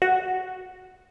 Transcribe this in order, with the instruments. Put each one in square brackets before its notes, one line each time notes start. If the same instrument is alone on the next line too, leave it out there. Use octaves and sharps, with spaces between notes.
[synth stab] F#4